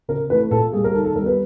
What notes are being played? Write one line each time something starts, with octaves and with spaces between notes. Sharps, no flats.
C#3 A#4
E3 A3 C4 B4
A#2 A4
G3 A#3 G#4
A#4
D#3 A4
A4
G3 B3 A#4
B4